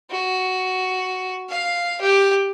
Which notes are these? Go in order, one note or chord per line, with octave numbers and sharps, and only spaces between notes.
F#4
F5
G4